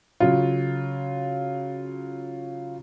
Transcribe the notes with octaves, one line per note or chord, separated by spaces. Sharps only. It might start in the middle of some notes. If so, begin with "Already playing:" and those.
C#3 F#3 F4